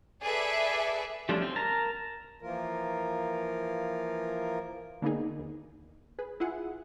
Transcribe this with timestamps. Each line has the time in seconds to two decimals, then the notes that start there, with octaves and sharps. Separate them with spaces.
0.22 G#4 A4 B4 D5 E5
1.29 F3 G3 A3 C#4 D4
1.42 C4
1.56 A#4 A5 A#5
2.42 E3 F3 A#3 F4 A#4
5.02 D3 A#3 B3 D4 D#4 G#4
5.39 D#2
6.19 G#4 B4
6.40 E4 F4 G#4 F#5